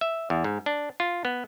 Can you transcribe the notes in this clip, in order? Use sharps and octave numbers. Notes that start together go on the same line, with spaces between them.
E5
E2
G#2
D4
F4
B3